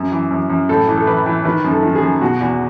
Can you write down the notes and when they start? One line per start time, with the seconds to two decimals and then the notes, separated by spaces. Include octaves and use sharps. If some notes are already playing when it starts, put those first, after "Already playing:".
Already playing: F#2
0.12 E3
0.31 F#2
0.50 F#2
0.69 A2 A4
0.88 E3
0.97 A4
1.07 E3 B4
1.26 E3
1.45 D#3 B4
1.64 F#2
1.71 A4
1.83 D#3
1.95 G#4
2.02 F#2
2.21 B2 F#4
2.41 E2